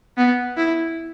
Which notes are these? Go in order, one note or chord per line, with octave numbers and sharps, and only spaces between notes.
B3
E4